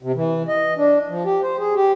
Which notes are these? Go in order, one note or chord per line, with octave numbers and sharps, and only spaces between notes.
C3
E3
D#5
D4
F3
G4
C5
G#4
G4